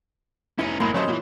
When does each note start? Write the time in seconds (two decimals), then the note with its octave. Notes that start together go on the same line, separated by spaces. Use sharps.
0.59 F1 C#4 D#4 E4 B4
0.80 F#1 A2 G#3 A#3 C4 A#4 B5 C6
0.94 F#3 A3 C#4 G4 C5 C#5 D#5
1.08 A#2 E3 F#3